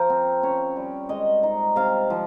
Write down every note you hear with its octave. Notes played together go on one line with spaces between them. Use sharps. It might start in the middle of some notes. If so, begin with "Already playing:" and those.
Already playing: F3 A#4 C5
C4
C#4 C#5
G3
G#3 D#5
D#4
C3 F5
F3